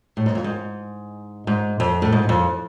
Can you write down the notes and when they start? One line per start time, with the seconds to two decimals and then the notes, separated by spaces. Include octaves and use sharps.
0.17 A2
0.26 G#2
0.35 F2
0.44 G#2
1.47 G#2
1.80 F2
2.02 A2
2.12 G#2
2.29 F2